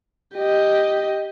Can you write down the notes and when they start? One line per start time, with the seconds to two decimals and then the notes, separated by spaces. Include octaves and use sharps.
0.36 G4 D#5